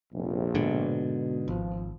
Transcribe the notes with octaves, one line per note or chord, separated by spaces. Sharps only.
F1 A#1
G#2 B2 D3
G#1 F3